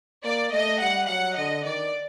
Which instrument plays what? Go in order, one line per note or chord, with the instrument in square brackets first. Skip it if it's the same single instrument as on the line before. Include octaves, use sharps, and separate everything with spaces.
[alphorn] A#3 [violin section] D5
[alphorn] A3 [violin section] D#5
[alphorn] G3 [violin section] F#5
[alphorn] F#3 [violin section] F#5
[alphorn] D3 [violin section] D#5
[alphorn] D#3 [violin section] D5